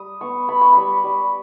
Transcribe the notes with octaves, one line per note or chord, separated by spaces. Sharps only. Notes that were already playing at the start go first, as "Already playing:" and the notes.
Already playing: G3 D#6
B3 C#6
B3 B5
C#6
G3 B5
G3